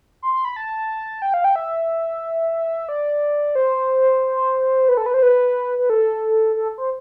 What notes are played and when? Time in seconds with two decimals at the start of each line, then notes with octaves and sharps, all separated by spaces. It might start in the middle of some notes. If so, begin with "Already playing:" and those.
0.22 C6
0.33 C6
0.45 B5
0.56 A5
1.22 G5
1.34 F5
1.44 G5
1.56 E5
2.89 D5
3.55 C5
4.89 B4
4.97 A4
5.06 B4
5.14 C5
5.22 B4
5.78 B4
5.90 A4
6.56 A4
6.78 C5